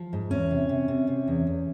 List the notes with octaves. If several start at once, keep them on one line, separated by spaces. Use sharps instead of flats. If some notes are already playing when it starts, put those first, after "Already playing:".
Already playing: F3
G#2
E2 C#4
C3
C3
C3
C3
E2
E2